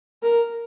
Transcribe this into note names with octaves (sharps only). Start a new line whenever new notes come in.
A#4